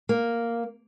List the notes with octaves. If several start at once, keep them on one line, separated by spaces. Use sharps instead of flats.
A#3